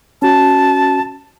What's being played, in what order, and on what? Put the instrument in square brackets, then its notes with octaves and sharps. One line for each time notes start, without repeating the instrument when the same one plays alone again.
[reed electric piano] C#4 F#4 [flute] A5